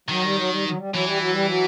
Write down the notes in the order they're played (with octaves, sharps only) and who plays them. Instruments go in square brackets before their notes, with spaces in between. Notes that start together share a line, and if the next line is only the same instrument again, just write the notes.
[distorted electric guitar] D#3 [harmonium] F#3
[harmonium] G3
F#3
G3
F#3
G3
[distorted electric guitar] E3 [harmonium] F#3
[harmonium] G3
F#3
G3
F#3